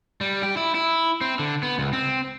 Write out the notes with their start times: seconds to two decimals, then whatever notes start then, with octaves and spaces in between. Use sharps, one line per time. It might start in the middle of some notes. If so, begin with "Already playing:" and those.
0.21 G3
0.43 G4
0.57 E4
0.75 E4
1.21 C4
1.39 D3
1.63 B3
1.79 C#2
1.93 C4